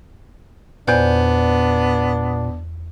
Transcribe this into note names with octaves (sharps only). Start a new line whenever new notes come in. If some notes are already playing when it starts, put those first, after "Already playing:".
E2 A#2 B3 D4 C5 D5